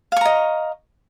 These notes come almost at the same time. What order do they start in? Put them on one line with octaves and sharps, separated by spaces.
F5 C#6 A#5 D#5